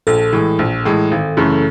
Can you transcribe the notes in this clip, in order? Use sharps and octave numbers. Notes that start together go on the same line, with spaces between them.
A#1 A4
A2 E3 G#3
A#1
A2 E3 G#3
G#1
F#2 C#3 E3 A3